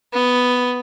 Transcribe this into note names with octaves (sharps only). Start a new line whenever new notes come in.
B3